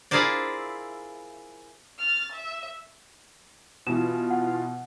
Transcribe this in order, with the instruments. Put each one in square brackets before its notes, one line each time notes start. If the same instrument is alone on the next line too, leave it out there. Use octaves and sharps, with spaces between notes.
[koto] E4 F4 G#4 A#4 C5 D5
[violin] F6 A6
E5
[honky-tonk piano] B2 E3 [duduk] F4 [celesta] E7
[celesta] F#5